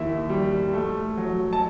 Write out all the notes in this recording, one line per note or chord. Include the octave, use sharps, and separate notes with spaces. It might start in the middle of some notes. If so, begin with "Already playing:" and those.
Already playing: D#2 D#3 E4 E5
G3
A3
F#3
A5